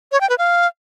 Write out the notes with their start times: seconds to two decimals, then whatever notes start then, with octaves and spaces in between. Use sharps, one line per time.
0.12 C#5
0.21 G5
0.30 B4
0.38 F5